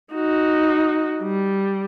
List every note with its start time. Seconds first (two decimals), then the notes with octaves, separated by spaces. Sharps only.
0.14 D#4 F#4
1.23 G3